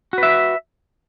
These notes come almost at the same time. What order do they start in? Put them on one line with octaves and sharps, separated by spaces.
F#4 B4 E5